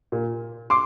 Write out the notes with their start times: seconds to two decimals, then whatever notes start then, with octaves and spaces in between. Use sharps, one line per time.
0.12 A#2
0.70 C6 D6